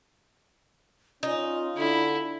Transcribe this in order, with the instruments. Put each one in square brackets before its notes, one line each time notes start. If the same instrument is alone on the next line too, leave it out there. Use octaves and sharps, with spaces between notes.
[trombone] C#4 [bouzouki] D#4 [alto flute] F4
[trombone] D3 [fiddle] E4